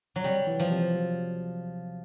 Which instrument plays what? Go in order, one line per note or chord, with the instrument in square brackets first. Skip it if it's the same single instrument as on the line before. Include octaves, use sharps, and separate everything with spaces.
[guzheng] F#3
[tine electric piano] C3 [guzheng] G3
[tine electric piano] E3
[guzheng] F3
[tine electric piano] C3
F#3